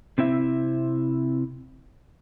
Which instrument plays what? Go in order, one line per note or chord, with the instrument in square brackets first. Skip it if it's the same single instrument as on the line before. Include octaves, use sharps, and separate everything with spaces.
[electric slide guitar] C3 C4 E4 E5